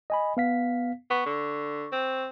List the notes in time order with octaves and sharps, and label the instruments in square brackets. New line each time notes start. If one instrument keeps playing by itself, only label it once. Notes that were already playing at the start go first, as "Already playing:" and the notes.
[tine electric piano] D#5 G#5 B5
B3 F5 B6
[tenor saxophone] B3 [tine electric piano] C#6
[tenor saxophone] D3
C4